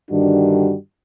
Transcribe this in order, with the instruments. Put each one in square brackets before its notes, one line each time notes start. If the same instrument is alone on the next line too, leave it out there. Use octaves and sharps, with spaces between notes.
[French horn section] G2 D3 D#3 G3 D4 F#4